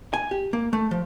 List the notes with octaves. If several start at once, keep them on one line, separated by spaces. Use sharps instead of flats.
G#5
G4
A#3
A3
F3